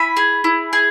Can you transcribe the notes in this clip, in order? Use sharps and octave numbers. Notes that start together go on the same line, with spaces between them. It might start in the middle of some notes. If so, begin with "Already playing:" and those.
Already playing: E4 G#5 B5
G#4
E4
G#4